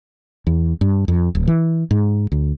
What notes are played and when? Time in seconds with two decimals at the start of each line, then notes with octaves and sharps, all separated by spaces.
0.47 E2
0.81 G2
1.08 F2
1.35 D1
1.48 E3
1.91 G#2
2.32 D2